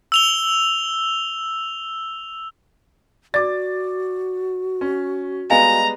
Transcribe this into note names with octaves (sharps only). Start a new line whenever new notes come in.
E6 F7 G7
F#4 D5 D6 A6
C#4
G3 G#3 B3 D#5 F5 G#5 A#5